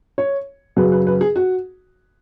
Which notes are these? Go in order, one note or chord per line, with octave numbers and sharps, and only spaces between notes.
C#5
F#2 C#3 F#3 B4
B4
B4
G#4
F#4